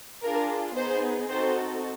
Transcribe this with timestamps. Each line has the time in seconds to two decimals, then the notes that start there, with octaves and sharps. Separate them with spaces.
0.23 D4 F4 G#4 A#4
0.76 B3 D#4 G#4 C5
1.29 C4 D#4 F#4 A4 C5